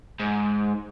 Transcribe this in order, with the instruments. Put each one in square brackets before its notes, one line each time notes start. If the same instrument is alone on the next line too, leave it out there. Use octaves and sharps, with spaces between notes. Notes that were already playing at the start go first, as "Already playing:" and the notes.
[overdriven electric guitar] G#2